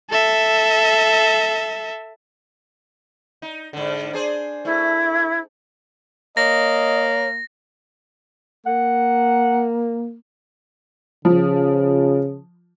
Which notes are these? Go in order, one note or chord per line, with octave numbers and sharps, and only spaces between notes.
A4 E5
D#4
G#2 D3
D4 G#4 C5
A3 E4
A#3 C#5 D#5 A#6
A#3 F#5
C#3 F3